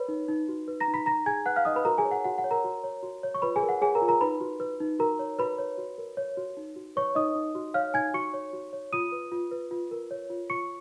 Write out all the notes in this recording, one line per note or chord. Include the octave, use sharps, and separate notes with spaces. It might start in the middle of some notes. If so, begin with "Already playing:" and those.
Already playing: A#4 B4 C#5 B5
D#4
D#4
F#4
B4
A#5 A#6
D#4
B5 B6
D#4 A#5 A#6
G#4 G#5 G#6
B4 F#5 F#6
F5 F6
D#4 D#5 D#6
B4 B5
F#4 A#4 A#5
G#4 G#5
C#5
F#5
F#4 F#5
F#5
C#5
A#4 A#5
F#4
C#5
F#4
C#5
C#6
F4 B4 B5
G#4 G#5
A#4
F#5
G#4 C#5 G#5
A#4 A#5
F4
A#4 A#5
D#4 B4 B5
F#4
B4
D#4
F#4 A#4 A#5
C#5
F#4 B4 B5
C#5
F#4
A#4
C#5
F#4
D#4
F#4
B4 C#5 C#6
D#4 D#5 D#6
D#4
F#4
C#5 F5 F6
D#4 G#5 G#6
F#4 C#6 C#7
C#5
F#4
C#5
F4 D#6 D#7
B4
F4
B4
F4
A#4
C#5
F4
F4 C#6 C#7